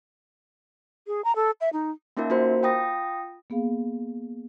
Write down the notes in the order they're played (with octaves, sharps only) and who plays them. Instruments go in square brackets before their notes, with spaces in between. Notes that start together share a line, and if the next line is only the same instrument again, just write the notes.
[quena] G#4
A#5
A4
E5
D#4
[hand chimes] A#3 C#4 D#4 F4 A#4 E5
A#3 F4 F#4 A#4 C5
F4 G5 D#6 A#6
[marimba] A#3 B3 G#4 F5